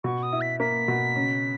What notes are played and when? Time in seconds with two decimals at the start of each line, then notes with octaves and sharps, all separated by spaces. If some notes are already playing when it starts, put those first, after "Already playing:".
0.04 B2 C#6
0.23 D#6
0.33 E4
0.41 B6
0.60 A#3 B6
0.88 B2
1.16 C#3